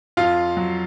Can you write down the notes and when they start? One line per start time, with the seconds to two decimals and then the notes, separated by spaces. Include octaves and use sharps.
0.17 F2 F4 F5
0.57 F#3